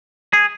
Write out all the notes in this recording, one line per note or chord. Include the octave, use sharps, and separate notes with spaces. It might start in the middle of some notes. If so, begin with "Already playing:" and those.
G#4